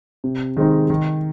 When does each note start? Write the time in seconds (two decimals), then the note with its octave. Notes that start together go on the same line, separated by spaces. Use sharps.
0.24 C3
0.57 D#3 G#3 C4 D#4
0.90 D#3